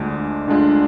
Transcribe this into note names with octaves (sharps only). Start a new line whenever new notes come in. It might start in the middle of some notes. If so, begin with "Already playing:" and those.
Already playing: D2 D3 G#3 D4 F4
D2 D3 G#3 D4 F4